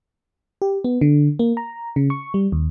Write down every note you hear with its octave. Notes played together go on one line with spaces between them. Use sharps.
G4
B3
D3
A#3
A#5
C#3
C#6
G3
D#2